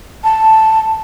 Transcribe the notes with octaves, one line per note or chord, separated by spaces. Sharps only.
A5